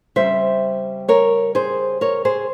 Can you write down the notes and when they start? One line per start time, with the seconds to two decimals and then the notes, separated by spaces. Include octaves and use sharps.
0.16 C#3 G3 C4 C5 E5
1.09 A#4 C#5
1.55 G#4 C5
2.01 A#4 C#5
2.25 G#4 C5